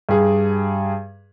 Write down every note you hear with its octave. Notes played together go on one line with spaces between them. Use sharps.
G2 G#4